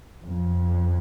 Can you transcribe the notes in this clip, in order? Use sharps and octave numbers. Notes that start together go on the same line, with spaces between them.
F2